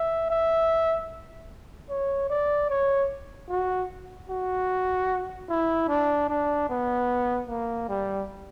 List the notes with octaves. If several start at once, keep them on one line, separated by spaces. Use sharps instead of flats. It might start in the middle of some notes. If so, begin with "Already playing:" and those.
Already playing: E5
E5
C#5
D5
C#5
F#4
F#4
E4
D4
D4
B3
A#3
G3